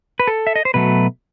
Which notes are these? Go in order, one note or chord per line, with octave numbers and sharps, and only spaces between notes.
B4
A4
E5
D#5
C5
B2 F#3 A3 B4